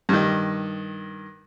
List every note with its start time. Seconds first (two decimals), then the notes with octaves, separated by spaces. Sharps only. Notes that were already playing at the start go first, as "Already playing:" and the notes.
0.09 G2 D#3